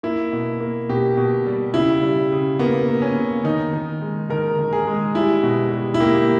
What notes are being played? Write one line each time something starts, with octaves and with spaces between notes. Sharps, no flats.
A#3 E4
B2
A#3
B2 G4
B2
G3
C#3 E4
G3
C#3
A#3 B3
A#3
C#4
C#3
D#3 D#4
D#3
G#3
D#3 A#4
D#3
G#4
G#3
G3 E4
B2
G3
E4
A#3 G4